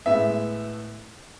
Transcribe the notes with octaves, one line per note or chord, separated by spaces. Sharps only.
A2 G#3 B3 E5